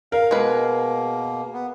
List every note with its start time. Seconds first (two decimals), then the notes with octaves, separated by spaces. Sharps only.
0.12 A#4 F5
0.31 B2 G#3 A#3 B4
1.53 B3